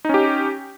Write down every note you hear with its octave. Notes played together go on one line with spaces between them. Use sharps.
C#4 D#4 G4